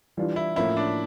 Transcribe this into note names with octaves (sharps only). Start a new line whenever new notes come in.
E3 G3 D4 F4
E4
A2 F3 A#3 C#4 E4 F4
D4